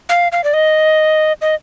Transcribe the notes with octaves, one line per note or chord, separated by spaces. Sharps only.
F5
F5
D5
D#5
D#5